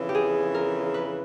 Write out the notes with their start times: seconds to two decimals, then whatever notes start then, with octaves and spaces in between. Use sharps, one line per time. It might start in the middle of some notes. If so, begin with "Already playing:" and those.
Already playing: F2 C#3 E3
0.09 G4
0.15 G#4
0.55 A#4
0.94 B4